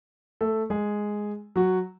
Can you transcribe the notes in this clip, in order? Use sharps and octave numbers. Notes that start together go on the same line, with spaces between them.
A3 A4
G#3 G#4
F#3 F#4